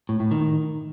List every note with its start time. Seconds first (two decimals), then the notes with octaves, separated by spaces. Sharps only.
0.09 A2
0.20 A2
0.31 D#3